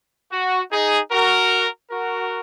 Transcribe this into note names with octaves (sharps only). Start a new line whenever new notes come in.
F#4
D#4 G#4
F#4 A#4
F#4 A#4